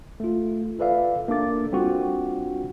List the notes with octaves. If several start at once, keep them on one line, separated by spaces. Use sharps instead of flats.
A3 F4
F4 A4 B4 D5 E5 F5
A#3 D4 A4 D6 A6
G3 C4 D4 F4 F#4